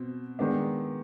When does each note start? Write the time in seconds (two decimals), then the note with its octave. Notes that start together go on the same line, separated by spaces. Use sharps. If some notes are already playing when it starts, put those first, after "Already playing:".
Already playing: B2 C4
0.39 D#3 G#3 B3 D4